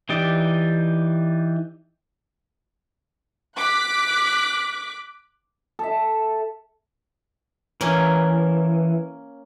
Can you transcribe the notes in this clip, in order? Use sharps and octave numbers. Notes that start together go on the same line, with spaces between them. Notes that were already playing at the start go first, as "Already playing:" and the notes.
E3 D#4 G4 D5
D6 F#6 B6
A4 E5
E3 A#3 C#4